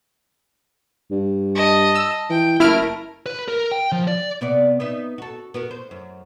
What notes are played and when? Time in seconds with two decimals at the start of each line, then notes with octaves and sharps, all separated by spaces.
1.11 G2
1.55 D#5 A5
1.95 E6
2.30 E3 G5
2.60 F#1 A3 E4 A#4 F6 D7
3.26 B4
3.48 A#4
3.71 G5
3.92 F3
4.08 D5
4.41 C3 B3 D5
4.80 B3 D#4 E5
5.18 F#4 A4
5.54 B3 F#4 A#4
5.71 C5
5.91 F#2